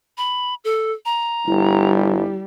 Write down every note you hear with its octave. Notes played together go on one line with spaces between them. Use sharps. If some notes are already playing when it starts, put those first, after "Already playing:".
B5
A4
A#5
G1 G3 E4